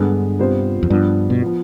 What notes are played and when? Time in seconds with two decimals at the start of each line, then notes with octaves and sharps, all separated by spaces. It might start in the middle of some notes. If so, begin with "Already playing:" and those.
Already playing: G2 D3 G#3 B3
0.39 C3 G3 B3 F4 C5
0.83 F2
0.90 G2 F3 B3 D4
1.30 B2
1.42 F3 B3 F4